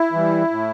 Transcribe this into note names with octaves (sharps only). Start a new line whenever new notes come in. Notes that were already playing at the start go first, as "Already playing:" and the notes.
Already playing: E4
E3 G3
A2